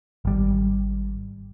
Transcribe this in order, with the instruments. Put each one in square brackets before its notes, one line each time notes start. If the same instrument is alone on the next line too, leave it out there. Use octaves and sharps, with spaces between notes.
[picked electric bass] G#1 G3